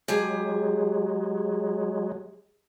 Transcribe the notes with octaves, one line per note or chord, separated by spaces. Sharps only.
F#3 G#3 G4 G#4 G#5